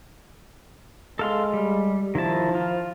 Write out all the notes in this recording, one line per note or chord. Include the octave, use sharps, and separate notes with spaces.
G#3 A4 F5 C6
G3
D#3 F3 E4 A5
F4